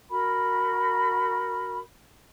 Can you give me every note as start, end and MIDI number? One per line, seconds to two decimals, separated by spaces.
0.10 1.78 66
0.10 1.78 70
0.10 1.78 83